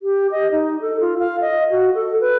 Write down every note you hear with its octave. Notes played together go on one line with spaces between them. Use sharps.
G4
D#5
D#4
A4
F4
F5
D#5
F#4
A4
B4